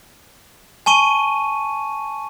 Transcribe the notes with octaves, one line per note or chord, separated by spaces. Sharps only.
G#5 A5 C#6 D#7